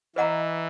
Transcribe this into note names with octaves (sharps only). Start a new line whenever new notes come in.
E3 B4 D#5 F#5 A#5